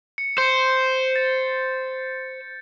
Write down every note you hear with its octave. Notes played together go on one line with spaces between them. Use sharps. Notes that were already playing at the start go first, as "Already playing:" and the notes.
C#7
C5 G6 C#7
A6